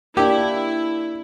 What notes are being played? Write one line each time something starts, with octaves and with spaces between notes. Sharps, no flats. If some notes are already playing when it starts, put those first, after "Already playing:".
A#3 D4 E4 G4